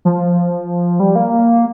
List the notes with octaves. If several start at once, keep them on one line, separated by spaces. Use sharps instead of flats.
F3
G3
A#3